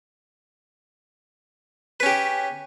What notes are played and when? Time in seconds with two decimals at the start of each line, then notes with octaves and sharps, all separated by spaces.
2.00 B4
2.03 C#4
2.06 G4